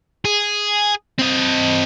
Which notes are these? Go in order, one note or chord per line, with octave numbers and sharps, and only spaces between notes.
G#4
C4 D#5